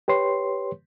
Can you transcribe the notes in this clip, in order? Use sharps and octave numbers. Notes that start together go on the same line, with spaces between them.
G4 B4 C#5 C6